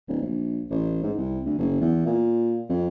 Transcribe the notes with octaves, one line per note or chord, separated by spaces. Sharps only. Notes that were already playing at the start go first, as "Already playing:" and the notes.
D1
A#1
A1
G#2
C2
D2
F#1
E2
A#2
F2